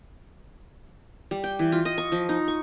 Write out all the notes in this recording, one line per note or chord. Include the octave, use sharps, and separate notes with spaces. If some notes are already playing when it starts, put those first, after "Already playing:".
G3
G5
E3
F4
D#5
C#6
F3
D#4
C#6